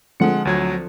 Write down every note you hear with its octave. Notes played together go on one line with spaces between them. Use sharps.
D3 F3 G#3 C4 F#5 C#7
D2 F#3 G#6